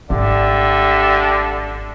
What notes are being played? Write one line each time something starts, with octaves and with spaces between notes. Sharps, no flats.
G#1 D3 G4 D5 E5